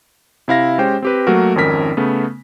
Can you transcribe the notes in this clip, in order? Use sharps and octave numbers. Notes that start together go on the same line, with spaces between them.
C3 E4 F5 A#6
G#3 C#4 G4 C5 G5
C4 G4 B4
F#3 A3 A#3 F#4 A#4
G#1 F2 D#3 C#4 A#4 B6
C#3 A3 B3